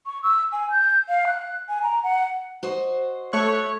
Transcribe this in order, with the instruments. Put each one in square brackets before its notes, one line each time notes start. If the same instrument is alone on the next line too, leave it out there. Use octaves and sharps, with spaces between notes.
[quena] C#6
E6
G#5
G6
F5
F#6
G#5
A#5
F#5
[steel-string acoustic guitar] F#4 C5 D#5
[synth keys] A3 C#6 F#6 [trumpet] C#5